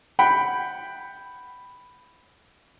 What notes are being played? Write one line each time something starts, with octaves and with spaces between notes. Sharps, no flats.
F#5 G5 B5